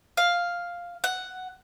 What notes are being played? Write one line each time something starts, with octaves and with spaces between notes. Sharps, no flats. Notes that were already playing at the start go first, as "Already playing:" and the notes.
F5
F#5